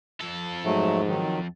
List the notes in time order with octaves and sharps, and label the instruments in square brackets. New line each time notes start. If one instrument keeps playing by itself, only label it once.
[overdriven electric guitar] F2 A4
[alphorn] G#2 [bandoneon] F#3 A3
[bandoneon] D#3 F#3